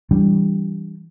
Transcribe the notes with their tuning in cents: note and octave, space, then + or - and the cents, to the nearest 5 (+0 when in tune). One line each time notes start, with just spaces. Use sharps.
E3 +0 G3 +0 D4 -15